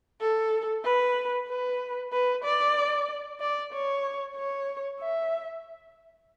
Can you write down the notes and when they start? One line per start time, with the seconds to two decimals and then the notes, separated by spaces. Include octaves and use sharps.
0.21 A4
0.84 B4
1.49 B4
2.13 B4
2.44 D5
3.40 D5
3.73 C#5
4.36 C#5
5.00 E5